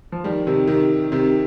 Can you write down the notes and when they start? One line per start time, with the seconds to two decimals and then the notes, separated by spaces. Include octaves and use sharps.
0.12 F3
0.24 D#3 G3
0.47 C3 D#3
0.67 C3 D#3
1.12 C3 D#3